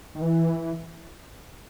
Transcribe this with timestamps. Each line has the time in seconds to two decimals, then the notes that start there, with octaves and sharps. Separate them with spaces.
0.15 D#3
0.22 E3